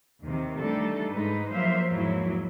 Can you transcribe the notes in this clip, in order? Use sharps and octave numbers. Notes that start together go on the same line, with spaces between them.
D#2 C3 D#3
E3 G3 A3 D4 D#4 A4
G#2 G#3 D#4 B4
F3 F#3 A#3 C5 E5 F5
E2 G#2 F3 F#3 A#3 E4